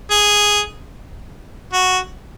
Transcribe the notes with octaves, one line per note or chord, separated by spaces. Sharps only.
G#4
F#4